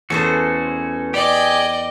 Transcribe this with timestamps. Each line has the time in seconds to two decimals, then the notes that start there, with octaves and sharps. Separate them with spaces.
0.10 E2 A3 C#4 F#4 A4 C5
1.14 G4 G#4 D5 D#5 G5